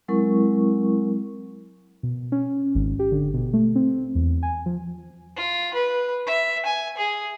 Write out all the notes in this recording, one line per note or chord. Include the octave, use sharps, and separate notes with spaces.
F#3 G#3 C4 E4 A#4 C#6
B2
C#4
G#1
G4
D3
B2
A3
C4
E2
G#5
F3
F4
B4
E5
G#5
G#4